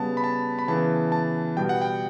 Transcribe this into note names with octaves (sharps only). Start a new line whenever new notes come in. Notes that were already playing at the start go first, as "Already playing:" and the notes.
Already playing: C#3 G3 B3 A5
B5
A5
B5
C#3 E3 B3 A5
A5
B2 G3 B3 G5
F#5
G5